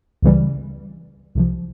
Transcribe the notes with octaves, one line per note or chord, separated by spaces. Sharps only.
C#2 C#3 E3 G3
C2 C3 F3